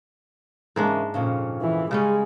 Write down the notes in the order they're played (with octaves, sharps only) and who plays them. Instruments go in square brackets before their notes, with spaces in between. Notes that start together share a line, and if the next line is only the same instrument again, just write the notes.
[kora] G#2 G#3 D4 [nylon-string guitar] C#3 E3 A#3
[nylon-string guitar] F2 A#2 C#3
[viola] E3
[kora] C#3 G3 C#4 [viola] G#3